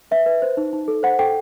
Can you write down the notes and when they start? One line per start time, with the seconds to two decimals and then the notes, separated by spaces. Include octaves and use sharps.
0.11 B4 E5
0.26 B4
0.42 C5
0.57 D#4
0.73 D#4
0.88 A4
1.03 C5 F#5
1.19 A4 G5